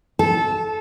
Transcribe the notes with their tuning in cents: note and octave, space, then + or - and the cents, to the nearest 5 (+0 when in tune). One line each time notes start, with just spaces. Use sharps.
A4 -20 A5 +0